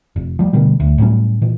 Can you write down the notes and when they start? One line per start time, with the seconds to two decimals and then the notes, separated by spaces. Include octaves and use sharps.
0.16 F1
0.39 F3 G3
0.53 B2 D3 G3
0.80 D2
0.98 A2 F#3 G3 C#4
1.42 A#2 E3